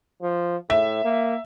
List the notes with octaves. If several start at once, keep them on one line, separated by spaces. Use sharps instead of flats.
F3
A2 E5
A#3